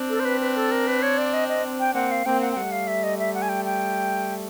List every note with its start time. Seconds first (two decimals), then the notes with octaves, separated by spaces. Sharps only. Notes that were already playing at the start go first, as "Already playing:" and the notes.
Already playing: C4 D4
0.09 A4
0.20 C5
0.25 B4
0.41 B4
0.56 A4
0.71 A#4
0.87 B4
1.02 C#5
1.18 D5
1.33 D#5
1.49 D#5
1.80 G5
1.94 A#3 C4 F#5
2.11 F5
2.26 A#3 C4 G5
2.41 F#5
2.52 G5
2.57 G3 A3 F#5
2.72 F5
2.87 E5
3.03 D#5
3.19 E5
3.34 F#5
3.42 G#5
3.49 G5
3.65 G5